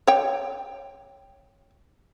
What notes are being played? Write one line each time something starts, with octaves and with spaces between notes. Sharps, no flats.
C#5 G5